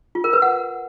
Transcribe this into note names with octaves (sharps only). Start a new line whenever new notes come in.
F4
A#4
B4
F#5